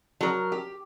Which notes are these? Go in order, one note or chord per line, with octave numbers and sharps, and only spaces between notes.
F#3 A#4
G4